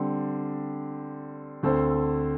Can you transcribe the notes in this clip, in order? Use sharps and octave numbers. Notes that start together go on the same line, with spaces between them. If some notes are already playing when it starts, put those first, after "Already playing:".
Already playing: D3 G3 C4
D2 D3 C4 A4 C5